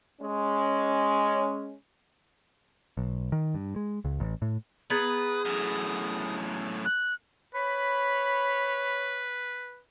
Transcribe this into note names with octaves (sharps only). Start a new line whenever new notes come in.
G#3 C#4
B1
D#3
G2
G#3
C#2
A1
A2
B3 G#4 B4 A#5 D#6
F#2 A2
F#6
B4 C#5 B5